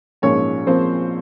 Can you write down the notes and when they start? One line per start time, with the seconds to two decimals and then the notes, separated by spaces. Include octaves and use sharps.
0.22 A#1 G#2 F3 A#3 C#4 C#5
0.67 F3 A#3 C4 C5